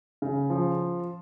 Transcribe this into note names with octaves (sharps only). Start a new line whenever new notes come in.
C#3
F3